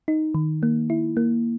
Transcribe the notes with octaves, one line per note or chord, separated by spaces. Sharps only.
D#4
D#3
A#3
E4
A#3